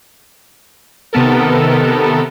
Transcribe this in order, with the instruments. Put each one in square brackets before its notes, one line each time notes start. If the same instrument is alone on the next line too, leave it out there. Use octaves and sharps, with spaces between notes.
[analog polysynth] C3 D#3 B3 A4 A#4